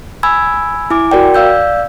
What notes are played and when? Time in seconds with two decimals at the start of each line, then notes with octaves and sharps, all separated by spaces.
0.23 G#5 B5 E6 G#6
0.90 E4 G#5 D6
1.11 F#4 A#4 D5 G5
1.34 D5 F5 E6 G6